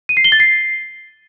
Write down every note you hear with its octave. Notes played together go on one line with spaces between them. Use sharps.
D#7
C7
G7
A6
C7